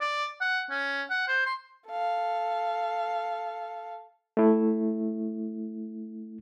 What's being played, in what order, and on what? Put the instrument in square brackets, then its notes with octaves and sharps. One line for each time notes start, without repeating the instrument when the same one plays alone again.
[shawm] D5
F#5
C#4
F#5
C5
C6
[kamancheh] A4 F5
[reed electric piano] A3 E4